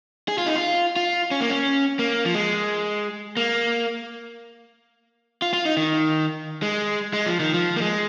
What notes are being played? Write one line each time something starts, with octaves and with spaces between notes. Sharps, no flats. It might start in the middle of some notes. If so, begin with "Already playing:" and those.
G#4
F4
D#4
F4
F4
C#4
A#3
C#4
A#3
F3
G#3
A#3
F4
F4
D#4
D#3
G#3
G#3
F3
D#3
F3
A#3
G#3